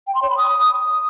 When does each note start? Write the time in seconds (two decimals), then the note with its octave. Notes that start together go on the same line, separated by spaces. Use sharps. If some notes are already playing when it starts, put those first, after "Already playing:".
0.07 G5
0.15 C6
0.22 C#5
0.30 B5
0.37 D#6